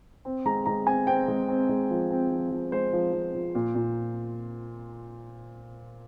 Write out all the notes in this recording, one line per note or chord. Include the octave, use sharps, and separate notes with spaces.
C4
G#3 A#5
G#3 A#5
C4 G#5
C4 G5
G#3
C4
G#3
F3
C4
F3
F3
G#3 C5
F3
F3
F3
A#2
A#2